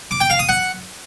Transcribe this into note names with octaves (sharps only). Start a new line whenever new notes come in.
D6
G5
F5
D#6
F#5